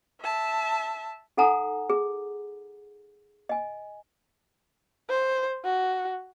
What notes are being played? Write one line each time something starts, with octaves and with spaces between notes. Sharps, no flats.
E5 A5
D#4 A4 F#5 G#5 A#5 D#6
G#4
D#5 G#5
C5
F#4